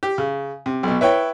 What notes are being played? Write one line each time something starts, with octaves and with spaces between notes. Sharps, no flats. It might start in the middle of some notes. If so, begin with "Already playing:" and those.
G4
C#3
C3
B1 B2
E4 B4 C#5 G5